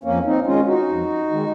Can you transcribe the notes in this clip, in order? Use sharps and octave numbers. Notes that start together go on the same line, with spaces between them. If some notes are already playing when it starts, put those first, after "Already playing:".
F2 A#3 C#4
C4 D#4
D#3 G#3 C#4 F4
D#4 F#4
F2
D#3 G#3